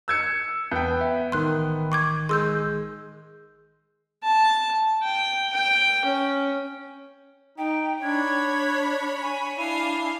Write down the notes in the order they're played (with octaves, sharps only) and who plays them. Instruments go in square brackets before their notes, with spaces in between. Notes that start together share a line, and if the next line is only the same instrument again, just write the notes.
[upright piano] E6 G#6 C#7
[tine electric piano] E2 G6 [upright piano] B3 G5
[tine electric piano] E5
[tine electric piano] A1 D#3 [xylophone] C6 F#6
[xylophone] C#6 D6 G#6
[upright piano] G#3 [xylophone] C6 E6 G6
[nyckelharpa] A5
G5
G5
C#4
[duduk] D#4 [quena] G5
[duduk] D4 [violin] C#5 B5 [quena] G#6
[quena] G#5
[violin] D4 F5 [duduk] E4